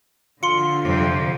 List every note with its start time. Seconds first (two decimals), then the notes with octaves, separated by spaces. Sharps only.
0.43 D3 F3 F4 C6 C#7
0.83 F2 C3